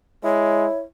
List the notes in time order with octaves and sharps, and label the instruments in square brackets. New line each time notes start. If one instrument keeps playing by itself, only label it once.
[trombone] G#3 [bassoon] E4 [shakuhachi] C#5